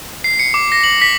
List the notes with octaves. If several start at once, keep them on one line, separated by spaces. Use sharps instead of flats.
C7
C#7
D6
A#6
F#7
B6